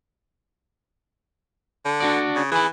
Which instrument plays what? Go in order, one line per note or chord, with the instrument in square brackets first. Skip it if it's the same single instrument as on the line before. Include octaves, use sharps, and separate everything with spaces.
[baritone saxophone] D3
[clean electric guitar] D4 F#4 D5
[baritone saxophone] C#3
[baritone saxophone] E3 [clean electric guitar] G#4 B5